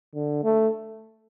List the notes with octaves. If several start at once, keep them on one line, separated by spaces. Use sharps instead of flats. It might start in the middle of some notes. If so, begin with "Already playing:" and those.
D3
A3